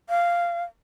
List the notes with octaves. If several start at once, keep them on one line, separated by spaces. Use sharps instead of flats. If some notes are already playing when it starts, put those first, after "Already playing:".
F5